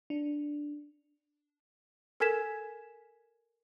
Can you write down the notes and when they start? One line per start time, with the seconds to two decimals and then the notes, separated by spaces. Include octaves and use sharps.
0.10 D4
2.20 A4 A#4 G#5 G#6 B6 E7